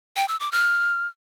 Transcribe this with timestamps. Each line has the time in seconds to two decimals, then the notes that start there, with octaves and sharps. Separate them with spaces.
0.17 G5
0.28 E6
0.40 D6
0.52 F6